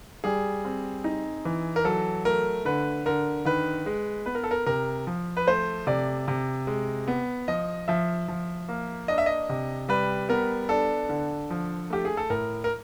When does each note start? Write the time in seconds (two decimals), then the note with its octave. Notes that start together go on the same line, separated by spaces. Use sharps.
0.24 G3 G#4
0.64 C4
1.04 D#4
1.45 E3
1.76 A#4
1.85 F#3 A4
2.25 A3 A#4
2.65 D3 B4
3.06 D3 A#4
3.45 D#3 B4
3.86 G#3
4.26 B3 B4
4.35 A#4
4.44 A4
4.51 A#4
4.66 C3 A#4
5.07 F3
5.37 B4
5.47 A3 C5
5.87 C3 D5
6.28 C3
6.67 G#3
7.08 B3
7.48 F3 D#5
7.88 F3 E5
8.28 F3
8.68 A#3
9.08 D4 D#5
9.18 E5
9.26 D#5
9.49 C3
9.89 G3 B4
10.29 B3 A#4
10.69 D4 A4
11.09 D3
11.50 F3
11.90 A3 G4
12.05 G#4
12.17 A4
12.30 A2 A#4
12.64 A#4